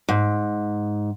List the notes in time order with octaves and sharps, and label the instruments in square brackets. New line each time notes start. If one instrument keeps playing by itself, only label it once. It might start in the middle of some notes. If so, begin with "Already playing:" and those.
[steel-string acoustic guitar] G#2